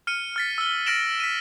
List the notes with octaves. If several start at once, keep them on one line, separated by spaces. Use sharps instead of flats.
F6 C#7 D#7
F6 A6 B6
E6 G7
F6 A6 A#6 D7 E7 F#7
B6 D#7